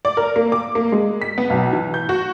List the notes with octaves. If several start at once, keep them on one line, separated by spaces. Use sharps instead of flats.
D5
A#4
A#3
D6
A#3
G#3
B6
B3
B1
E3
G6
F#4